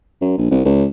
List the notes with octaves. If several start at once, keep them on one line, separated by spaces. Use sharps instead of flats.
F#2
A#1
C2
C#2